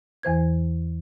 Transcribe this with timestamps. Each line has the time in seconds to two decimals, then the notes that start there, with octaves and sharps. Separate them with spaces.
0.23 E2 E3 C5 G#6